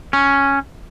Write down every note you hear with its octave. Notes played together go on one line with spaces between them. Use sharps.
C#4